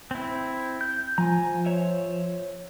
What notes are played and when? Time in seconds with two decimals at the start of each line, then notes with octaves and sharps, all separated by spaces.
0.11 C4 E4
0.81 G6
1.18 F3 G#5 A#5
1.66 C5 C#5 E5